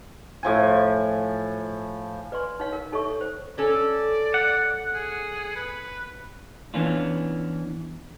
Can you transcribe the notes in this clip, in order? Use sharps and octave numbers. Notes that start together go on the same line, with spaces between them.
A2 F3 G#5
B4 D5 G#5 C6
D#4 C#5 F5
A#4 F5
D#4 A4 C#5 E5 C#6
C#5
C5
C#4 A4 D5
F#5
G#4
B4
E3 B3 C#4 D4 F4